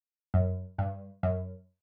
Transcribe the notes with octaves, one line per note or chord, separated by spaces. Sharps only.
F#2
G2
F#2